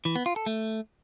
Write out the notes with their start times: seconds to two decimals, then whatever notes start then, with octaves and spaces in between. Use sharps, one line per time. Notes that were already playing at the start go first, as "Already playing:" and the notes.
0.05 E3
0.16 B3
0.26 F4
0.36 A4
0.46 A3